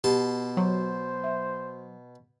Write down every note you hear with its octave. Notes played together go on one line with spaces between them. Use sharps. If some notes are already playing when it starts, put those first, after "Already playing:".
B2 G4 A5 C6
F#3 C5
E5